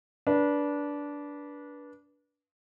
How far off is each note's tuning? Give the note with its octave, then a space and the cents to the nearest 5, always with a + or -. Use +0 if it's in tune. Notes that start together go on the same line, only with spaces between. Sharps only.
D4 -15 B4 -25